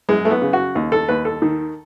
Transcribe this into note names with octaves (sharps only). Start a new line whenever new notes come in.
F#2 G#3
A3
B3
C#3
F#4
D#2
A4
D#2 B4
A4
D#3